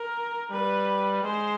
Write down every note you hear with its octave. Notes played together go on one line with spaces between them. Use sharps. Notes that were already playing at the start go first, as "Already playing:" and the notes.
Already playing: A#4
G3 B4
G#3 C5